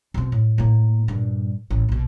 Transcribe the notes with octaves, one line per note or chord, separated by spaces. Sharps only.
B2 C4
A2
A2 A#3
G2 A#2
A1
A#1 B2